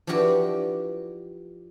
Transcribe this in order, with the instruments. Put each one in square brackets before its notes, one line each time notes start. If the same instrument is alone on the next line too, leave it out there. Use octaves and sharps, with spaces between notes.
[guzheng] F3 D4 E4 F#4 G4 B4